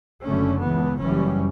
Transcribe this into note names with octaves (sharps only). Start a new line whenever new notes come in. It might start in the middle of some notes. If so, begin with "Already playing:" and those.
F#1 F#2 D3 A3 C#4
C#2 C#3 E3 B3
F#1 F#2 E3 G3 C#4